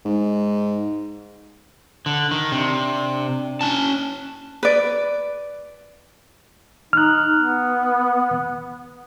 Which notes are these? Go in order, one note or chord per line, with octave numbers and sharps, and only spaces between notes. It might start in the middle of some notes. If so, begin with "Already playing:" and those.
G#2
D3
D#3
C3 D4
C#4 A5
B4 D5
D#4 F6 F#6
B3